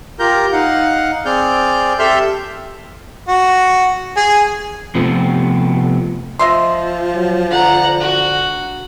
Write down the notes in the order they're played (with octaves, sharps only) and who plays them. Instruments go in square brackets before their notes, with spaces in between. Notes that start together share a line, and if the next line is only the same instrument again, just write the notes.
[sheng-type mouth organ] F4 G4 A#4 A#5 G6
D#4 F5 F#5
C4 G#4 D5 F6 G6
G4 A4 E5 C6 F6 G6
[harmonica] F#4
G#4
[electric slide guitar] C3 F3 A3 B3 C4
[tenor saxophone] F3 [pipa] D#5 E5 C6
[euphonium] F#3
[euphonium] D3 [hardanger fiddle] F#5 A#5
[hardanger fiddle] F#4